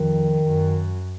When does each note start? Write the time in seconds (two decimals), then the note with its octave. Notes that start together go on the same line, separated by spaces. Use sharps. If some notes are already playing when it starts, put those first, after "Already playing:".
Already playing: F2 D#3
0.44 F#2